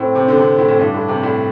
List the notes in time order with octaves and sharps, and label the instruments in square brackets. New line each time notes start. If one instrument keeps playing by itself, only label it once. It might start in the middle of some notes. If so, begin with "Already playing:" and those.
Already playing: [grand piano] A2 [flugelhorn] C4
[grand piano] C3
D3
C3
A2
A2
[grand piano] G2 [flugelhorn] D4
[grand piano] A2
C3
A2